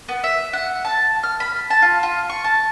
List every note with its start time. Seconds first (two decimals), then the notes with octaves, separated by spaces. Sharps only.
0.09 B3
0.24 E5
0.53 F#5
0.85 A5
1.23 F6
1.40 B5
1.70 A5
1.82 F4
2.03 F4
2.29 C#6
2.44 A5